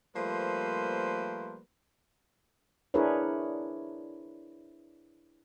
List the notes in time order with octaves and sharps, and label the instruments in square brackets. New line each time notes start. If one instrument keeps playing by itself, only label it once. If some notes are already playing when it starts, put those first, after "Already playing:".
[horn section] F3 G3 A3 A#3 B4 C5
[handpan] D4 E4 G#4 A#4 B4 C#5